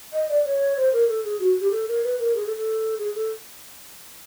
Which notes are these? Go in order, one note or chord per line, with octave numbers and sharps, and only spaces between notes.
D#5
D5
C#5
C5
A#4
A4
G#4
F#4
G4
A4
A#4
B4
A#4
G#4
A4
A4
G#4
A4